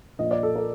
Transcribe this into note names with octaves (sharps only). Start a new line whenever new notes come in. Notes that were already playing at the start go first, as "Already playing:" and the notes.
A#1 A#2 F3 D#5
D5
A4
A#4